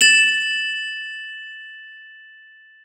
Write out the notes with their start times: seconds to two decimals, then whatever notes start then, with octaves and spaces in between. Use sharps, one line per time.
0.01 A6 E7 F#7